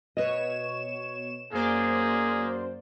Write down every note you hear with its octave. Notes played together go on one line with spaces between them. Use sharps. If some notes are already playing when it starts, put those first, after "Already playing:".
B2 B4 C#5 D#5 E7
F#2 A#3 G#4 C5 D5